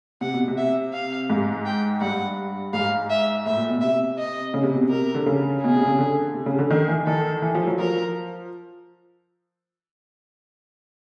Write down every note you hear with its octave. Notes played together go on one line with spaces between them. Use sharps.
C3 F#5
B2
C3
E5
F5
G#2
G5
G2 F#5
G#2 F5
E5
A2 E5
A#2
B2
C3 E5
D#5
C#3
C3
B2
C3
A#4
D3
C#3
B2 G#4
C3
C#3
D3
C3
C#3
D3
D#3
E3
D#3 A4
E3
F3
F#3
F3 A#4